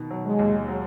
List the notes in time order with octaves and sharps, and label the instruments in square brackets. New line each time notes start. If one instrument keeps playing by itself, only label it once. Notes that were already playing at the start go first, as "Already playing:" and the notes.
Already playing: [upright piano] B2 D#3
F#3
[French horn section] G#3
[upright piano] D#2
F#3